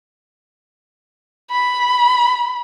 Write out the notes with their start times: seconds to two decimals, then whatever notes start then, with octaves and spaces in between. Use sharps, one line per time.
1.51 B5